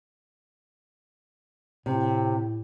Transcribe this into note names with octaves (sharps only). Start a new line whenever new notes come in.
A2 C3